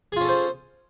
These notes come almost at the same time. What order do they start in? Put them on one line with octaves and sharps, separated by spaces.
G#4 F4 C#4 A4 C5